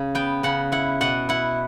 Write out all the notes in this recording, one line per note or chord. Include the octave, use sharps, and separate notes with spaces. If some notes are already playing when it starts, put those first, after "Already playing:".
Already playing: C#3
B3 G5
C#3 F#5
E4 F#5
B2 F#5
E4 F#5